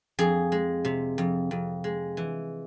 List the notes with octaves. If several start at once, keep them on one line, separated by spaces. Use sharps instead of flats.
F2 G#4
G#3
C3
F2
F2
G#3
E3